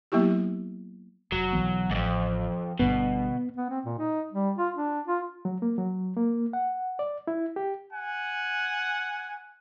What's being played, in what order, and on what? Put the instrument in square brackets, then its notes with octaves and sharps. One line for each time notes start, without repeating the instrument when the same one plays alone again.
[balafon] F#3 A#3 B3 E4 G4
[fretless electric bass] F1 [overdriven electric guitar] F#3
[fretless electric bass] B1 E3 B3
[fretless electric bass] A1 [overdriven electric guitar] F2 G#2
[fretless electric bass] G1 G2 D3 [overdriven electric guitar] B2 [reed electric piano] B3
[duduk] B3
C4
A#2
D#4
G3
F4
D4
F4
[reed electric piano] F#3
A#3
F#3
A#3
F#5
D5
E4
G4
[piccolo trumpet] F#5 [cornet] G#5